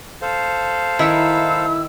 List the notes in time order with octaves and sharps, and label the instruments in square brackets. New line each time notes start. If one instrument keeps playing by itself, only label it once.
[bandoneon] A4 C5 F5
[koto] D#3 [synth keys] E4 [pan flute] E6